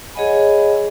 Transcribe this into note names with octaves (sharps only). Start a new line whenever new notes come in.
G#4 C#5 D#5 F#5 G#5 B5